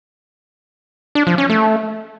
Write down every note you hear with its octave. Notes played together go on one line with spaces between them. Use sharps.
D4
F3
C#4
A3